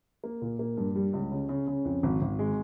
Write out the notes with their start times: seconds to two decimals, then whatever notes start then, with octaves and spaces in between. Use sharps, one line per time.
0.24 A#3
0.42 A#2
0.59 A#3
0.77 G2
0.95 G3
1.13 C#2
1.32 C#3
1.49 C#3
1.67 C#3
1.85 F2
2.03 G#1
2.22 G#1
2.39 G#3